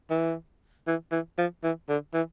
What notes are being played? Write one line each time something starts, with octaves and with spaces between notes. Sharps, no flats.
E3
E3
E3
F3
E3
D3
E3